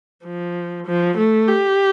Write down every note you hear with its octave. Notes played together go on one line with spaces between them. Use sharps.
F3
F3
A3
G4